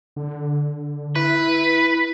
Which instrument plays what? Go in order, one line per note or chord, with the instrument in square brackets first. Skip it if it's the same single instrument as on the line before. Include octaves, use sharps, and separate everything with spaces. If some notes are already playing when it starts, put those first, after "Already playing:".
[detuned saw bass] D3
[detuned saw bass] E4 [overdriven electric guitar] B4